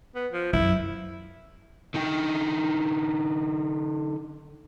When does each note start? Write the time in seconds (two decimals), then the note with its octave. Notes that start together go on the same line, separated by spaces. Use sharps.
0.15 B3
0.33 F3
0.53 F#2 E4
1.94 D3 D#4 G5